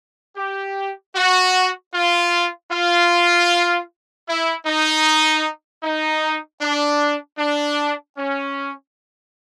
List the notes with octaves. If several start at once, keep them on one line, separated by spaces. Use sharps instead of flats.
G4
F#4
F4
F4
E4
D#4
D#4
D4
D4
C#4